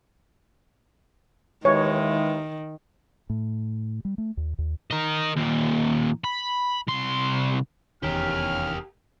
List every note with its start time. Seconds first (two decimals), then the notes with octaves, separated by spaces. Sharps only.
1.65 D#2 D#3 E3 G#3 C#5
3.30 A2
4.05 G3
4.18 A3
4.37 D#2
4.58 D#2
4.91 A#4 D#5
5.36 D#2 A#2
6.24 B5
6.88 C2 C6
8.03 F1 E2 D#3 C#4 G4 A#4 F6